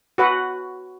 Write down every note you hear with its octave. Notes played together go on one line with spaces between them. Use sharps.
F#4 B4 F#5